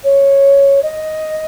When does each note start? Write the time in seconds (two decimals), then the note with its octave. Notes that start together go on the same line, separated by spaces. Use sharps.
0.04 C#5
0.83 D#5